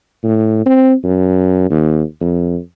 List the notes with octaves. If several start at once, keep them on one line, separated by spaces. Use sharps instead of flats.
A2
C4
F#2
D#2
F2